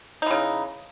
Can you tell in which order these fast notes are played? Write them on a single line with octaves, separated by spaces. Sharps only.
D#4 E3 C#3